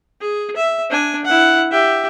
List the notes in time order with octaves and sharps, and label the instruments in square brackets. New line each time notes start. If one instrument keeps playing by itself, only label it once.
[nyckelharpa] G#4
E5
D4 G#5
E4 F#5
G4 E5